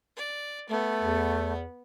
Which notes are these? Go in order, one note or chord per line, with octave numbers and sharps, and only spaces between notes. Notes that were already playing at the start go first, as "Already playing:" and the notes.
D5
A3 B3
E2